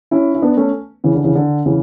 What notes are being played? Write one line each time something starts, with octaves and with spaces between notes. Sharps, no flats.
C#4 E4
E4
B3 D4
A3 C#4
C#3 E3
D3
C#3 E3
D3
C#3 E3